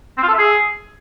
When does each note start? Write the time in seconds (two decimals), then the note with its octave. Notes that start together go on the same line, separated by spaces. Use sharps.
0.18 C4
0.23 F4
0.28 A4
0.33 E5
0.39 G#4